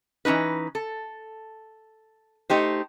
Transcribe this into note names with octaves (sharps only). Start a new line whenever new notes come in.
E3 G#3 C#4 D#4 B4
A4
A3 D#4 G4 C5